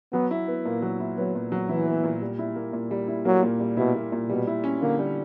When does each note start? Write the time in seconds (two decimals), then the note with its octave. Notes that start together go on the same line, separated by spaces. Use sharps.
0.12 F#3 B3
0.31 E4
0.48 B3
0.65 A#2 A#3
0.82 F#3
1.00 E4
1.18 F#3 B3
1.35 A#2
1.52 F#3
1.69 E3 E4
1.87 B3
2.04 A#2
2.21 G3
2.39 E4
2.56 A#3
2.73 A#2
2.91 G3
3.08 E4
3.25 F#3 A#3
3.43 A#2
3.60 G3
3.77 B2 E4
3.95 A#3
4.12 A#2
4.29 B2 G3
4.47 E4
4.64 C#4
4.81 D3 A#3
4.99 G3